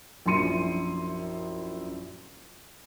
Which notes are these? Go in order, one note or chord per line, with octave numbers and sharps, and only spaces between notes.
A#1 F#2 E4 C6 C#7 D#7